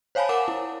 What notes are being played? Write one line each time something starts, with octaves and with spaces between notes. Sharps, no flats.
C5 C#5 F5 G#5 A5 B5
A#4 F#5 D6 E7
E4